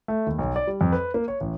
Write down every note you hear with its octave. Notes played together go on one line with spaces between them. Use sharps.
A3
D#2
B1
D5
G3
F2
B4
A#3
C#5
A1